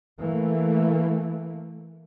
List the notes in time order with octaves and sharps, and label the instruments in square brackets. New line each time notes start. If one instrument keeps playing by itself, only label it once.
[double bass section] E3 A3 A#3